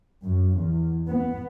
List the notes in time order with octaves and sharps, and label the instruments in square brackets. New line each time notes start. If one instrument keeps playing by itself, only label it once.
[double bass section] F#2
E2
B3